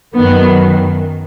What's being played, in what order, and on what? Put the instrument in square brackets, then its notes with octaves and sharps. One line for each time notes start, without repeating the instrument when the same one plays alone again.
[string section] F#2 D#3 F#3 B3